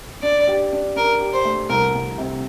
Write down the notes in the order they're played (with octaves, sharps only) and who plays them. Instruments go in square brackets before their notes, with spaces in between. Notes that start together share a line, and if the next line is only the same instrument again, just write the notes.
[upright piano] D4 [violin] D5
[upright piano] G4
D4
[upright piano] D4 [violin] A#4
[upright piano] G4
[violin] C5
[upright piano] A3
[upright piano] C2 [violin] A#4
[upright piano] C2
C3